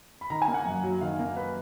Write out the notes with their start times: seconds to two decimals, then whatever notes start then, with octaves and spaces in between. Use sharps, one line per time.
0.21 B5
0.30 D#3 A#5
0.42 G#5
0.48 A#3
0.54 F#5
0.65 F#2
0.83 F#3
1.01 D#3 F5
1.19 A#3
1.36 B4